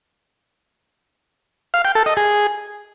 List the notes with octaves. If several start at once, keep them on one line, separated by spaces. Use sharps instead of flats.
F5
G5
A4
D#5
G#4